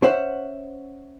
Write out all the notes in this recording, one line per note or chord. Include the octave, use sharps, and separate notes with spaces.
C#4 C5 E5 F#5